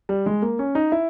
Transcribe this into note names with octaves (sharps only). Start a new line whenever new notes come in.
G3
G#3
A#3
C#4
D#4
E4